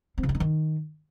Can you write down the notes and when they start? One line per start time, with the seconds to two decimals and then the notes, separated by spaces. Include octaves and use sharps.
0.18 C4
0.23 C#3
0.29 E4
0.35 D#4
0.40 D#3